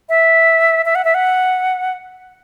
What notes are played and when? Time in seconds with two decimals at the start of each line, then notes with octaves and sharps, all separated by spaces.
0.09 E5
0.86 E5
0.95 F#5
1.05 E5
1.14 F#5